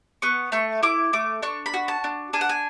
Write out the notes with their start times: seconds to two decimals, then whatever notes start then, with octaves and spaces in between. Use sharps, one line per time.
0.22 B3 C#6
0.52 A3 C#6
0.83 E4 D6
1.13 A3 D6
1.42 D4 C#6
1.66 B5
1.74 F#4
1.88 A5
2.04 D4
2.33 D4 G#5
2.41 F#5
2.49 G#5